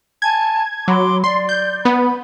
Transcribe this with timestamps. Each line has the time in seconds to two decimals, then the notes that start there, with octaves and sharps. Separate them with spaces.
0.22 G#5 A5 G#6
0.88 F#3 B5 C6 D6
1.24 D5 C6
1.49 G6
1.85 B3 B5